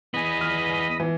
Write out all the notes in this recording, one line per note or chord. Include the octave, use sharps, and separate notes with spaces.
E2 B3 D#5 G#5 B5
F6
E3